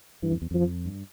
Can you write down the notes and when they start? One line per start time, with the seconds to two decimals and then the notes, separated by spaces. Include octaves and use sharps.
0.22 G2 E3
0.32 F2
0.42 E2
0.51 F2 F3
0.85 G2